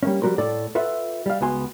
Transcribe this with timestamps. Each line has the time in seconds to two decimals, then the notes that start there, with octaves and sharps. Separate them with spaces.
0.03 G3 A#3 C#4
0.22 F3 G3 F#4 A#4 C5
0.38 A2 A4 D5
0.75 F4 A4 B4 E5 F#5
1.26 G3 F5
1.41 C#2 B3 F#4 G#5 C6